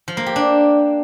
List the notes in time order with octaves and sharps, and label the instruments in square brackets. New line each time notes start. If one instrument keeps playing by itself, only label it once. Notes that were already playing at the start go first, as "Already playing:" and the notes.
[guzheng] F3
A#3
G4
D4